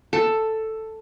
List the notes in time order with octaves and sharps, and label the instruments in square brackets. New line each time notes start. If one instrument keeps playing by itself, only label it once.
[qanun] A4